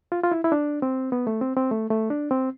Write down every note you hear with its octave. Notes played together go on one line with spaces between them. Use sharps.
F4
F4
E4
E4
D4
C4
B3
A3
C4
C4
A3
A3
D4
C4